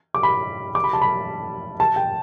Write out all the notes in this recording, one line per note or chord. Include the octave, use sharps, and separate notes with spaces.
D6
B5
D6
B5
A5
B5
A5
G5